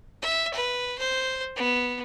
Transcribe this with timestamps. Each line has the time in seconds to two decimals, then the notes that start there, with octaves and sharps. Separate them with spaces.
0.22 E5
0.54 B4
0.98 C5
1.56 B3